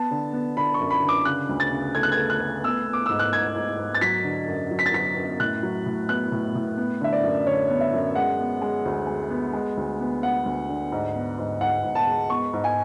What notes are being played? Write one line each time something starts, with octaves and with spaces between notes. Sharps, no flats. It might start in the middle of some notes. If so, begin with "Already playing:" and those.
Already playing: B3 A5
D3
B3
D3 B5
C#6
F#2
B5
D3
D6
C#3 F#6
D2
A6
C#3
A3 G#6
F#6
G#6
A3
F#6
A3
B3 E6
B3
D6
G#2 E6
F#6
G#2 G#6
G#2
G#2
A6
F#3 B6
D3
F#2
F#3
B6
A6
F#3 B6
F#2
A2 F#6
F#3
A2
B3 F#6
A2
A2
B3
D3 E5
D5
F#2
D3 C#5
B3
E5
F#2
G#3 F#5
B3
G#3
D2
G#3
B3
G#3
D2
B3
B3 F#5
D2
D3
G#2
B3
G#2
G#2 F#5
G#2
A5
G#3
B3 C#6
G#2
G#5